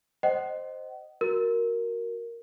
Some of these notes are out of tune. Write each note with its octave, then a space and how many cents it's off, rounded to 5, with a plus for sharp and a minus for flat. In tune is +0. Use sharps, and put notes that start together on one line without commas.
C5 +0 D#5 -15 F#5 +40
F#4 +0 A#4 +0